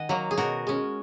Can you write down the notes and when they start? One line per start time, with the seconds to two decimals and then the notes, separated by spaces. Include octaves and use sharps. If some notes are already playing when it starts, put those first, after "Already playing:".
Already playing: D#3 D#5 F#5 G#5
0.09 F#3 A#3
0.31 G#4
0.38 B2 F#4 A#4
0.67 G#3 C#4